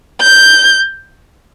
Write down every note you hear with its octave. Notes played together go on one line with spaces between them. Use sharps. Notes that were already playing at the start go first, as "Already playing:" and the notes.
G6